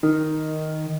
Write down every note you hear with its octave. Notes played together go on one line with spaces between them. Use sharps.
D#3